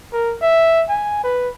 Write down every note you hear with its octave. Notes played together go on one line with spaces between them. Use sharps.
A#4
E5
G#5
B4